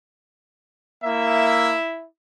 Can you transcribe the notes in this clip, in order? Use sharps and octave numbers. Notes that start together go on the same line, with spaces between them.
A#3 E4 E5